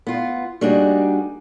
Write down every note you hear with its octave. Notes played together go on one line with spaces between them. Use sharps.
B3 F4
G3 A#3 D4 D#4 F#4 G#4